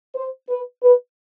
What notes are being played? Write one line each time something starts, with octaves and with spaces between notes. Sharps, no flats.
C5
B4
B4